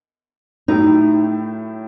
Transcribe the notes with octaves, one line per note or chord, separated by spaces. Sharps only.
A2 F#3 A3 D#4 E4 G4